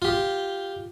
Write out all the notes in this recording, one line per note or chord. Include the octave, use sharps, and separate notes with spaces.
F4 G4